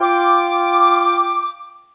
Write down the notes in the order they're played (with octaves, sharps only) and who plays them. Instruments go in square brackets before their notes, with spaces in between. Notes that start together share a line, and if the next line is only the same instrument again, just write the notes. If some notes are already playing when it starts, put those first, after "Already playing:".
[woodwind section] F4 G5 D6